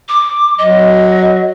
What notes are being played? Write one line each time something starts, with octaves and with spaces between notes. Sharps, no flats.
D6
F#3 D#5